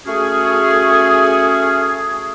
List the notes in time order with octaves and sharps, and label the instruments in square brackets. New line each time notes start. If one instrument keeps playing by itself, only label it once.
[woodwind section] A3 C#4 F#4 G#4